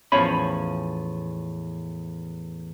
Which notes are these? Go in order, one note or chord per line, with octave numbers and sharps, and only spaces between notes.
E2 A2 F3 C#4 C#5 B5